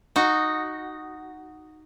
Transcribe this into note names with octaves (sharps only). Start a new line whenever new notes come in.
D#4 F#4